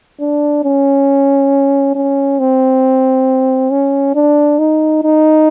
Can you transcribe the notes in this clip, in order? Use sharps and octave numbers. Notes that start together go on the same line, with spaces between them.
D4
C#4
C#4
C4
C#4
D4
D#4
D#4